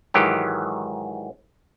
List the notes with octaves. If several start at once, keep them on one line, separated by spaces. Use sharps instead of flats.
G#2 D#3 E3 F#3 G4